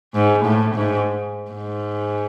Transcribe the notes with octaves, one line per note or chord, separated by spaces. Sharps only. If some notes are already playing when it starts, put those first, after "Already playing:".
G#2
A2
G#2
G#2